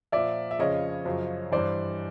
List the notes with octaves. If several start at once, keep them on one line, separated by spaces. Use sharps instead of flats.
A#2 F3 D5 E5
E5
F2 C#3 F3 C#5 D#5
F#2 C#3 F3
G2 E3 C5 D5